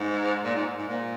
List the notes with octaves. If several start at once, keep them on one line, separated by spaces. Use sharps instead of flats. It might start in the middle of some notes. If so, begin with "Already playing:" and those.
Already playing: G#2
A#2
G#2
G#2
A#2